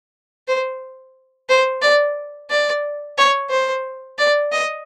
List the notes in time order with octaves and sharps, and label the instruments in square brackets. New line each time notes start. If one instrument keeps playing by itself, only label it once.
[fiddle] C5
C5
D5
D5
C#5
C5
D5
D#5